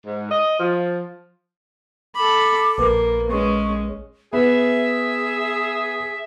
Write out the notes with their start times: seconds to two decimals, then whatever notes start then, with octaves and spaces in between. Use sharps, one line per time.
0.05 G#2
0.30 D#5
0.59 F3
2.16 A4 B5 D6
2.78 A#1 A#3 B4
3.30 G#3 C#4 C#6
4.33 B3 G#4 E5